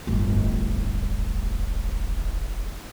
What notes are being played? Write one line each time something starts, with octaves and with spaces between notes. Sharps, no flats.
D1 G1